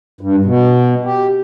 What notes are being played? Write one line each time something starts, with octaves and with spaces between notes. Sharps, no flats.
G2
B2
G4